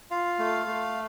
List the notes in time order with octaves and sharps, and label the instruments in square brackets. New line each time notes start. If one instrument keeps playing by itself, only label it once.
[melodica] F4 F5
A3
A3